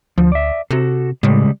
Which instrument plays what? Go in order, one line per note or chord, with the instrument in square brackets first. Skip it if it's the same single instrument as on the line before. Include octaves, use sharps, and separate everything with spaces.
[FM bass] D2 [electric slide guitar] F3
[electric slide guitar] D5 E5
[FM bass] C3 [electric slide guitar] F#4 A4
[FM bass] A2 [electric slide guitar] C#3 G3 G#3